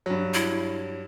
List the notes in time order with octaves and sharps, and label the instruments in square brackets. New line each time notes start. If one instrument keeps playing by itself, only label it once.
[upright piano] G2 F#3
[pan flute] E4